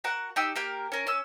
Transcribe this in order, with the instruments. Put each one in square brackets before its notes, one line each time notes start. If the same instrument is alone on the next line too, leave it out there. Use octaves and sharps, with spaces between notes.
[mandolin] F#4 A#4 F#5
D#4 G4 E6
A#3 G4 A#4
C#4 A#4
C#4 E6